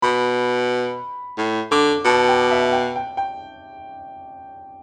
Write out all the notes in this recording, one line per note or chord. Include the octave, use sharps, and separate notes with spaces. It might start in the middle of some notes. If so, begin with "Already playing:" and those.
B2 B5
A2
D3 D6
B2 A5
G5
E5
G5
G5
G5